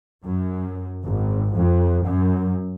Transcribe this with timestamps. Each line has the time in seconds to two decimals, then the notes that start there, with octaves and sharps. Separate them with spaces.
0.25 F#2
1.06 G#1
1.55 F2
2.06 F#2